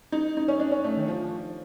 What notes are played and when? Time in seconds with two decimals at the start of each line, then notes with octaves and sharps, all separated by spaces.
0.12 D#4
0.37 D#4
0.48 C#4
0.60 D4
0.72 C#4
0.84 A3
0.97 D#3
1.08 F3